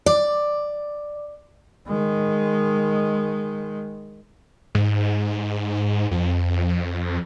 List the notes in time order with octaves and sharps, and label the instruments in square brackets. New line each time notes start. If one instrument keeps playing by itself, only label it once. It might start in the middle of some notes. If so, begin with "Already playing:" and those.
[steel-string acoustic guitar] D5
[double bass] D#3 G#3
[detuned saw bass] G#2
F2